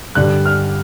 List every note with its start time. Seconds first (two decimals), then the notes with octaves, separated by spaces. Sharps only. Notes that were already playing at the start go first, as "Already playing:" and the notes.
0.15 G2 D3 G3 F#6
0.46 F6